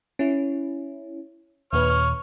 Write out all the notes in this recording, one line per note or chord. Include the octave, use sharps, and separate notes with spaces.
C#4 E4
D#2 A#2 B4 C#5 F6